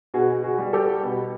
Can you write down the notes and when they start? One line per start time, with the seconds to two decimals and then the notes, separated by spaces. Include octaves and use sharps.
0.14 B2 F#4 G#4
0.44 F#4 G#4
0.58 G3
0.73 G4 A4
1.03 B2